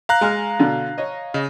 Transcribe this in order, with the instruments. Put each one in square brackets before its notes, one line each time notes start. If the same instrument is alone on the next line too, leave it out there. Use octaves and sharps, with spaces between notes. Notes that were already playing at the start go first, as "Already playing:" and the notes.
[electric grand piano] F5 A#5 F#6
[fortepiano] G#3 G#5 F6
B2 D3
C#5 D#5
[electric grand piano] C#3 [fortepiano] D#5